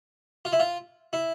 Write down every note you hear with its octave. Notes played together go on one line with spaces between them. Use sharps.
F4
E4
F4
E4